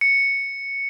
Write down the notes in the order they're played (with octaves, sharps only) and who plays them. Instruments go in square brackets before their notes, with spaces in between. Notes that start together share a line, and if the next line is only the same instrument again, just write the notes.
[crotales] C#7